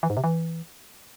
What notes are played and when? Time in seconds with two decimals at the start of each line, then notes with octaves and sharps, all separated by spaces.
0.03 E3
0.10 G#2
0.17 C3
0.24 E3